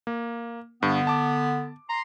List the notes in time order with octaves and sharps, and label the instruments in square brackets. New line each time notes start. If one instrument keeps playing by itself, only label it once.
[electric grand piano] A#3
[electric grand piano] G2 [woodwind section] D3 B3
[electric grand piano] A5 D6
[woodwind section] A#5 C6